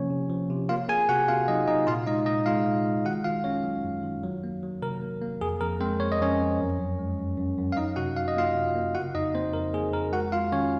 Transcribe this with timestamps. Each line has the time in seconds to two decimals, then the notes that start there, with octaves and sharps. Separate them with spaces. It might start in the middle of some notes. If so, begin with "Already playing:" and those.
Already playing: C3 F3 A#3 C#4 C#5
0.10 C3
0.30 F3
0.50 C3
0.69 A#3 F4 F5
0.89 A#3 G#4 G#5
1.09 C3 F#4 F#5
1.28 C3 F4 F5
1.48 F#3 D#4 D#5
1.67 C3 D#4 D#5
1.87 A#2 F4 F5
2.07 G#3 D#4 D#5
2.26 A#2 D#4 D#5
2.46 G#3 F4 F5
2.66 A#2
2.86 G#3
3.05 D#3 F#4 F#5
3.24 D#3 F4 F5
3.44 F#2 C#4 C#5
3.64 F#3
3.84 F#2
4.03 D#3
4.23 F#3
4.43 A#3
4.63 F#3
4.82 C3 A#4
5.02 A#3
5.21 A#3
5.41 F2 G#4
5.61 F2 A#4
5.80 G#3 C4 C5
6.00 F2 C#5
6.12 D#5
6.20 F2 C#4 C#5
6.39 F2
6.60 F#2
6.79 F#2
6.99 G#3
7.19 F#2
7.38 F#2
7.58 F#2
7.72 F5
7.76 F#3 D#4 D#5
7.96 C3 F#4 F#5
8.17 F#3 F5
8.28 D#5
8.37 A#3 F4 F5
8.55 C3
8.75 A#3
8.95 C#3 F#4 F#5
9.15 F2 D#4 D#5
9.34 A#3 C4 C5
9.53 F2 A#4
9.74 A#3 G#4
9.93 F2 A#4
10.12 G#3 F#4 F#5
10.32 G#3 F4 F5
10.52 D#3 C#4 C#5